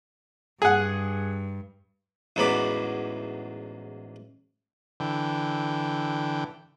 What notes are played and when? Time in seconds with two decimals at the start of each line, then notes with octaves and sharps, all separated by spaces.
0.62 G2 G#4 F#5
2.36 A1 E2 G#2 F#3 B5 D6
5.00 D3 E3 G5